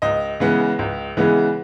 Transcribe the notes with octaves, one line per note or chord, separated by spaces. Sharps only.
C#2 D#5
C#3 E3 G#3 B3
C#2
C#3 E3 G#3 B3